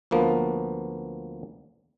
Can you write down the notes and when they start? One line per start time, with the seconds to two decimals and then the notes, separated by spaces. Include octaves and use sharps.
0.11 D2 F3 A#3 B3